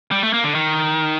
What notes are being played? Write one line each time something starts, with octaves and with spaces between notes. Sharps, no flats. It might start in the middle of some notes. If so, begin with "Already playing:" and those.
G3
A3
A#3
D3
D#3